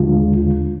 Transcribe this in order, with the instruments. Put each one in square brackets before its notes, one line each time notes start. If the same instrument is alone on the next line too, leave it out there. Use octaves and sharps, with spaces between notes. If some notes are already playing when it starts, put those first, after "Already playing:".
Already playing: [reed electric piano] D#2 D3 G#3 F4